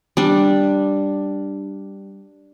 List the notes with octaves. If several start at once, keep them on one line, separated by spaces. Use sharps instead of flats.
G3 D4